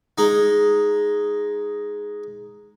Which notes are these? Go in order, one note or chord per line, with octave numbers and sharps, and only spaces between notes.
G#3 D#4